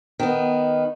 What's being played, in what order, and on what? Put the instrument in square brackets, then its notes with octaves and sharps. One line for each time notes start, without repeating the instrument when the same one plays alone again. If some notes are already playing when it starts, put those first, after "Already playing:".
[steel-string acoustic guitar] D#3 B3